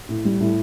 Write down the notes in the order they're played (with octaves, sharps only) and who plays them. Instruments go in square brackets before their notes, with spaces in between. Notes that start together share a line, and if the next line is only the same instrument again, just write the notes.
[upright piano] A2
G3
A2